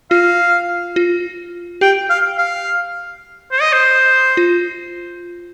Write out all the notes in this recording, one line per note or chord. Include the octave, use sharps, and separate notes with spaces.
F4 F5
F4
G4 G5
F5
F5
C5
D#5
C5
F4